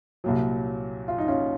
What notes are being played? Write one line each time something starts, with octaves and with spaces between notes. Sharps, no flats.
C2 A#2 F#3
F4
D#4
C#4 F4